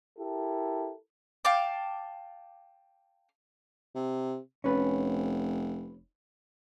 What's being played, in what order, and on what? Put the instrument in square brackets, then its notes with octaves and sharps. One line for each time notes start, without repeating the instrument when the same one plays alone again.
[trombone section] E4 G4 A4 A#4
[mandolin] F5 G5 A5 D6
[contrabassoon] C3
[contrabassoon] F1 [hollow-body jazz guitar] C#4 B4